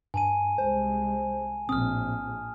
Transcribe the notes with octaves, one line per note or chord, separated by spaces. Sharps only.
G2 G#5 A5 D#7
C2 G#3 C5
A#1 A2 C4 D#6 F6